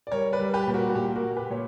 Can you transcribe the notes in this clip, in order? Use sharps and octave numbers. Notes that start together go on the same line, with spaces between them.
D5
G3 A#4 C#5
B4 D5
G3
G4 B4
A#2
F#4 A#4
F#4
A#2 G4
F#4 A#4
A#2
G4 B4
A#2 C#5